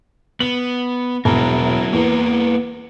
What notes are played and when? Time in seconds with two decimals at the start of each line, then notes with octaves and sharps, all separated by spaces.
0.40 B3 F#7
1.25 E1 F#3 E4 A#4
1.93 E2 A#3 B3